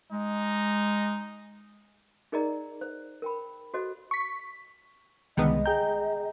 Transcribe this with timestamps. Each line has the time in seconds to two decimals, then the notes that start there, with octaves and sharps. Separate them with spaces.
0.12 G#3 D#4
2.32 D#4 G#4 A#4 D5 D#5 A#5
2.81 C5
3.22 A#4 G5 B5
3.74 F#4 A4 C5 D#5
4.11 C#6 B6
5.37 C2 D3 D#3 G#3 B3 D#5
5.66 G#4 G5 A#5 G6